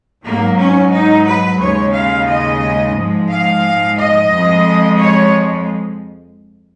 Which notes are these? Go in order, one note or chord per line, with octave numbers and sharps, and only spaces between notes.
G#2 F#3 A#3
C#4
D#4
B4
D#2 C#3 G#3 C#5
F5
D#5
G#2 F3 G#3
F5
D#5
F2 F3 G#3
C#5